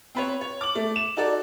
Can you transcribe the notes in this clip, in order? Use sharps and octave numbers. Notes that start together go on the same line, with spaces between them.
C4 B4 C#5
C#5
D6 F#7
A3
E7
D#4 F#4 A4 D5